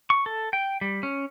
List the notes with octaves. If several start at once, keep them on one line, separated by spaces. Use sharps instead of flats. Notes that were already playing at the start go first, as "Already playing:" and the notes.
C#6
A4
G5
G3
C#4